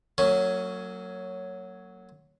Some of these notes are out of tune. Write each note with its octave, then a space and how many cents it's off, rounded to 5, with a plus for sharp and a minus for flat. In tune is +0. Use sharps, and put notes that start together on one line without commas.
F#3 +0 A#3 -40 C#4 +0